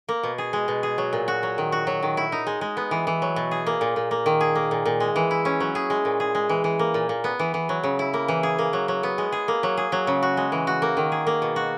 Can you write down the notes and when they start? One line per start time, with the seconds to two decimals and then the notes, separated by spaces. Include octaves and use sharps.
0.09 A#3
0.23 B2
0.38 G#4
0.53 G#3
0.68 B2
0.83 G#4
0.98 F#3
1.13 A#2
1.28 F#4
1.43 F#3
1.58 D#3
1.72 F#4
1.87 F#3
2.03 D#3
2.17 E4
2.32 D#4
2.47 G#3
2.61 G#3
2.77 B3
2.91 E3
3.07 E3
3.22 F#3
3.36 B2
3.51 G#4
3.66 A#3
3.81 A#2
3.96 A#2
4.11 A#3
4.26 D#3
4.41 G#4
4.55 A#3
4.71 A#2
4.85 A#2
5.00 G#3
5.16 E3
5.31 E4
5.45 C#4
5.60 F#3
5.75 G#4
5.90 G#3
6.05 A#2
6.20 G#4
6.35 G#3
6.49 E3
6.64 E3
6.79 A#3
6.94 A#2
7.09 A#2
7.24 B3
7.39 E3
7.54 E3
7.69 F#3
7.83 C#3
7.99 E4
8.13 A#3
8.28 E3
8.43 G#4
8.58 A#3
8.73 F#3
8.88 F#3
9.03 B3
9.18 G#3
9.32 G#4
9.48 A#3
9.63 F#3
9.77 G#4
9.92 F#3
10.07 C#3
10.22 F#4
10.37 G#3
10.52 E3
10.67 F#4
10.82 A#3
10.97 D#3
11.12 G#4
11.27 A#3
11.42 B2
11.56 F#4